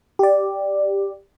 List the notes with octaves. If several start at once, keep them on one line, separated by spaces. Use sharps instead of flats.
G4 D5